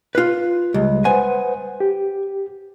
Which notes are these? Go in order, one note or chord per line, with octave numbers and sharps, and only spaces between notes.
F4 B4
C#2 G3 G#3
B4 C5 F#5 G#5
G4